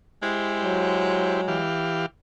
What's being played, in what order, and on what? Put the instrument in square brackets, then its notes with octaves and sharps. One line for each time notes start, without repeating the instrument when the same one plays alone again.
[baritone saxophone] G#3 [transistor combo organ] E4 G4 C5
[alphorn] F#3
[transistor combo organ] E3 G4 F5